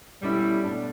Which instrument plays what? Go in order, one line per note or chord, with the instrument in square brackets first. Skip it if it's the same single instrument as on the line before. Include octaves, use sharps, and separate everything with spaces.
[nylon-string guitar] B2 A3 C#4 E4 [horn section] G3
[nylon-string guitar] B2 A3 D4